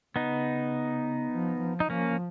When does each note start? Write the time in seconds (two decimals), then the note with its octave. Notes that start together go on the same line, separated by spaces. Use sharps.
0.16 C#3 B3 D#4
1.32 F3
1.61 F3
1.80 D#4
1.90 F3 A#3 C#4